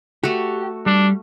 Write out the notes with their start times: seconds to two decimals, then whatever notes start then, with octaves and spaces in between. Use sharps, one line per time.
0.24 A3 F#4 G4
0.86 G3 D4